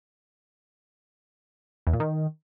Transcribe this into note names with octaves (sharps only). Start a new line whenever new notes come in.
E2
A#2
D#3